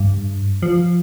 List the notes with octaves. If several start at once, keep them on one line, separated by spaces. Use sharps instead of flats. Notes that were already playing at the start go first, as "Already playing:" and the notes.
Already playing: G2
F3